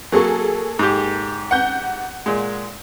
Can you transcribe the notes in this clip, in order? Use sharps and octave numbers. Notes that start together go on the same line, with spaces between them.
F#3 A#3 G#4 A4 C#6
G#2 G4
F#5 G6
A#2 G#3